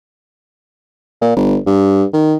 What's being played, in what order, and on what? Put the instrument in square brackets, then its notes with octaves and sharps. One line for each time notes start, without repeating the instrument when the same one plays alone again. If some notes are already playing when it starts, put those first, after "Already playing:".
[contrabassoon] A#2
G1
G2
D#3